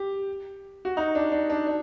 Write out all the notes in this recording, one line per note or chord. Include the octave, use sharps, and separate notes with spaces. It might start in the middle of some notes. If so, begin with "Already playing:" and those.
Already playing: G4
F#4
D#4
D4
D4
D4
D4